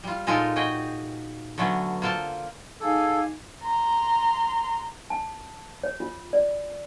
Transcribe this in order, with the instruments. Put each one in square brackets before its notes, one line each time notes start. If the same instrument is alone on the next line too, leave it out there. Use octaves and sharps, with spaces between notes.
[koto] G3 F4
A#2 G#3 D#4 F4 A4 A#4
F#4 G#4 D#5 G5
D3 F#3 A3 B3 C#4
A#3 F4 A4 C5 A5
[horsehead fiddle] D#4 G#5 [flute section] G#4 F5 D6 [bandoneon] A4
[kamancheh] A#5 C6
[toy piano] A5
C#5
F4
D5